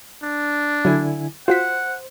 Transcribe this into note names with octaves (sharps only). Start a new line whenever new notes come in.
D4
D3 F#3 E4 G#5
F4 F#4 C5 F#5 B6